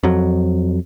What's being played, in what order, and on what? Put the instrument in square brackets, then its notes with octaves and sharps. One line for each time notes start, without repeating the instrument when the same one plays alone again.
[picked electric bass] F2 F#3